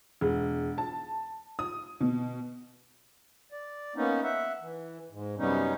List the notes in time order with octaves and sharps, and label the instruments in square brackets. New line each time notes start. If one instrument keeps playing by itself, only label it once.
[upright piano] E1
A5
D#6
B2
[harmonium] D5
A#3 B3 C#4 D#4
E5 F#5
E3
G#2
F#2 C3 G3 B3 C#4 D#4